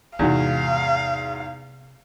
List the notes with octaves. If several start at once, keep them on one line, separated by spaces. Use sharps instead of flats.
E2 G#2 C3 B3 F#4 F5